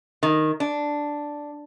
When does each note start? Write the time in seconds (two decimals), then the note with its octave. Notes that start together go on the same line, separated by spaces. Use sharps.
0.23 D#3
0.60 D4